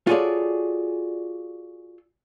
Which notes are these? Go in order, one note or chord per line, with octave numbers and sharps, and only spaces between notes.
F4 F#4 G#4 A4 C#5 D5